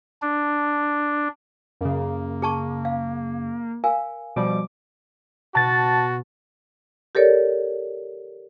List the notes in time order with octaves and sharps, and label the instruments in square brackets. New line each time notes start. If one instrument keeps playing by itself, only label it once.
[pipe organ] D4
[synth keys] F#2 C#3 [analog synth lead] A#3
[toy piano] G#4 A5 C#6
F5
A#4 F5 G#5
[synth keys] B2 F3 G3 [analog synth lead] D6
[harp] B2 [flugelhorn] F#4 [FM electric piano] A5 A6
[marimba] G4 A4 A#4 C#5 D5